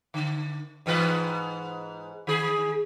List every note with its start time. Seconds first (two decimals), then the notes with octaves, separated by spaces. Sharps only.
0.14 D3
0.86 G#2 E3 B4
2.27 D#3 G#4